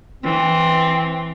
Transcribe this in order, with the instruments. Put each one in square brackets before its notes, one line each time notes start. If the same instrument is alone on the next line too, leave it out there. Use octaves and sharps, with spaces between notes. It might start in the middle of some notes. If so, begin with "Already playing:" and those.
[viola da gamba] E3 [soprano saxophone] C4